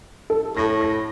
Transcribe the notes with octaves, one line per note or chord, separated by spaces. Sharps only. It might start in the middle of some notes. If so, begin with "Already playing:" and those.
A4
A2 A#6
A#6